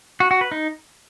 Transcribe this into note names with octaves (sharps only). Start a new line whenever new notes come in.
F#4
F#4
B4
D#4